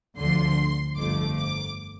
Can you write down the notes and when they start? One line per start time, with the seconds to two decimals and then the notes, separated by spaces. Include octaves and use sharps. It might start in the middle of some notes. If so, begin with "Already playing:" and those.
0.19 D2 D3 F3 C6
0.96 G1 F2 F3 A3 D6
1.36 D6